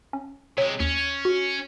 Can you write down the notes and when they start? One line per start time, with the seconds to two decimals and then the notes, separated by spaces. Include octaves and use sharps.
0.13 C#4
0.58 C3 G#3 C#5
0.80 D#2 C#4
1.25 F#4